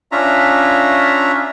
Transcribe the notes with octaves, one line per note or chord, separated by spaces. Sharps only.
C#4 D4 F4 E5 A#5